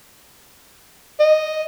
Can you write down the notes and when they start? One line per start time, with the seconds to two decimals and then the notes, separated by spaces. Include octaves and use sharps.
1.20 D#5